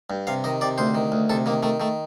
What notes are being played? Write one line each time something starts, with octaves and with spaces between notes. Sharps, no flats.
G2
C3 F5
D#3 D#5
C3 D5
D2 C5
D#3
D2
C3 A4
D#3 A#3
D#3 A3
D#3 A3